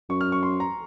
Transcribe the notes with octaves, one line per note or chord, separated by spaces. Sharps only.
F#2 C#6
F6
C#6
C6
A#5